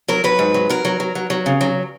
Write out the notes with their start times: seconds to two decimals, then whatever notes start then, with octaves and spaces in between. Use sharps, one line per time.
0.08 F#3 A#4
0.24 F#3 B4
0.39 G#2
0.54 F#3
0.69 F#3 A#4
0.85 F#3
1.00 F#3
1.15 F#3
1.30 F#3
1.46 C#3
1.61 F#3